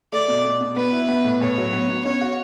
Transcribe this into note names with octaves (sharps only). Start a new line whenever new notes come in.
A3 D5
B2
B2
B2
B3 B4
E4
B3
A2
A2 C#5
F#3
B3
B3
C#4 C#5
F#4